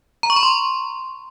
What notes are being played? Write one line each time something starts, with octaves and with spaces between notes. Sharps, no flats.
A#5
C#6
B5
C6